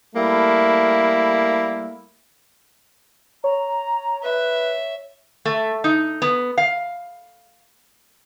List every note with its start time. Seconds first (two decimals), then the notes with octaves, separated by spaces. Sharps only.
0.15 G3 A3 A#3 E4
3.44 C#5 A#5
4.23 B4 E5
5.45 A3
5.84 D#4
6.22 B3
6.58 F5